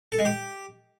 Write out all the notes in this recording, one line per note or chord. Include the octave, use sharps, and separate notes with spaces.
A4
G#3
G4